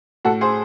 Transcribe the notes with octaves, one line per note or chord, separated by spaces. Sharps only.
A2 F#4 A4
G#4 C5